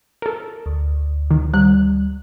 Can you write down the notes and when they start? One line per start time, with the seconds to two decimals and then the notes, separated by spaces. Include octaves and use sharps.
0.22 A4 A#4
0.66 D2
1.31 D#3
1.54 G3 F#6